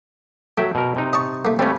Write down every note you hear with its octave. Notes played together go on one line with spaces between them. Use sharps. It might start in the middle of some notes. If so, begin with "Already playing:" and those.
F#3 A3 E5 G5
B2 A#4
C3 D#4
D#5 A5 C#6
A3 A#3
G3 A3 C4 C#4 F4